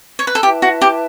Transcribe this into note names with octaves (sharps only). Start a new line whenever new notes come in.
C#5
B4
A4
E4 G4 B4 E5 A5
F#4
G4